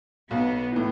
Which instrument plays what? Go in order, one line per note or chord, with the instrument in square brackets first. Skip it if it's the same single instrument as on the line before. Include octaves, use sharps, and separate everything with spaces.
[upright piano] B1 [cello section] B3
[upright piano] A2 E3